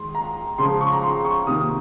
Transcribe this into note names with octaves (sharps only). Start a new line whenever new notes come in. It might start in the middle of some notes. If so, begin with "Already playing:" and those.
Already playing: D#3 G#3 C6
A#5
C#3 F3 G#3 C6
C#6
A#5
C6
C#6
C3 D#3 A#3 D#6